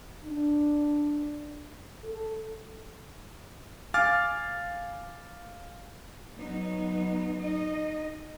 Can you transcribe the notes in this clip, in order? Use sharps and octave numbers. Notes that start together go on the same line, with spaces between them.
D4
A4
F5 G#5 D6 F6 A6
F#3 B3 D#4
D#4 D#5